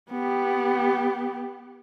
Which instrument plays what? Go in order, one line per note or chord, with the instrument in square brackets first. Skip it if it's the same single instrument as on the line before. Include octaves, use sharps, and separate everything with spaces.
[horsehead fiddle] B3 G4